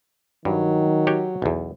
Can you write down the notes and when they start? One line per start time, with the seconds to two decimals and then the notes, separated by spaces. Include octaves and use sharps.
0.45 G2 D#3 F#3
1.07 F#4 G4 C#5
1.42 B1 E2